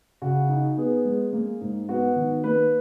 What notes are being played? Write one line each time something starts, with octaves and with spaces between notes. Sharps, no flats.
C#3 F#4
D#4
B3 G#4
G#3
A#3
G#2
B3 F#4
D#3
A#3 B4